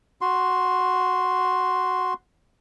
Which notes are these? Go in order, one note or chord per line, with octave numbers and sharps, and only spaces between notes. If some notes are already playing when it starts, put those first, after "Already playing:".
F#4 C6